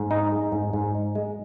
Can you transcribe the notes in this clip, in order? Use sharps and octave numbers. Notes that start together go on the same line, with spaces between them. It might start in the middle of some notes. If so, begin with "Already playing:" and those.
Already playing: G#2
D#4
G#3
G#2
G#2
D#4
G#3